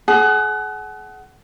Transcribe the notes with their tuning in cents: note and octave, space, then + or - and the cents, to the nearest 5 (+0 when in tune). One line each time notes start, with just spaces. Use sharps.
G#4 +40 F#5 +25 D#6 +0